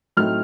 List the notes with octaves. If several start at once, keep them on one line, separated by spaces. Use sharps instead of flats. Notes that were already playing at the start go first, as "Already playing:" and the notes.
A2 F#3 A3 C4 D#4 F6